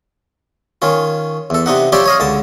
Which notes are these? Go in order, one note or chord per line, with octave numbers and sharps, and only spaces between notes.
D#3 C#4 F4
E2 A4
C3 D4 D#4 F#5
F3 G3 C4 G4 C#5 D5
C#5 D#5 F5
C#2 D3 A5